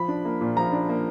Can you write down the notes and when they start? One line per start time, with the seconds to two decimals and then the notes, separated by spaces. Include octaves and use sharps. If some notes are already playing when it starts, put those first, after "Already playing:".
Already playing: F3 B5
0.08 D4
0.25 A#3
0.41 A#2
0.56 F3 A#5
0.72 D4
0.89 A#3